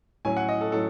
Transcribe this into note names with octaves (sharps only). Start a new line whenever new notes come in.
A2 F#3 C#4 G#5
F#5
D#5
A4
A2 F#3 C#4 A4